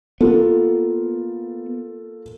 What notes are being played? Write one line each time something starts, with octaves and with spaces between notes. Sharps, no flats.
A#3 B3 F4 A4